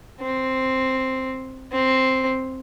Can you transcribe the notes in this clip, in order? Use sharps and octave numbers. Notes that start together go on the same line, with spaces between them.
C4
C4